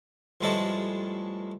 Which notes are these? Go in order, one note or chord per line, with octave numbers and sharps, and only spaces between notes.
A1 G2 F3 G#3 A3 A4